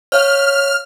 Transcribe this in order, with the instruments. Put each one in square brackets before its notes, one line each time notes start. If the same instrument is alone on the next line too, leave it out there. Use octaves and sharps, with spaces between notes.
[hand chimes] C#5 F5 [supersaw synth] F6